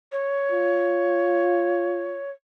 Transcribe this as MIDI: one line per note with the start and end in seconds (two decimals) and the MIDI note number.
0.12 2.31 73
0.52 2.22 65